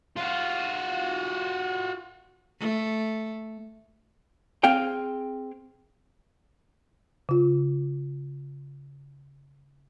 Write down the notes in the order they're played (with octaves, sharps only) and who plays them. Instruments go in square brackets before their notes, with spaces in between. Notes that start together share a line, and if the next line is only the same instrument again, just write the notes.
[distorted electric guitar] F4 F#4
[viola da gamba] A3
[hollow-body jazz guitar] C4 G#4 F5 G5
[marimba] C#3 F4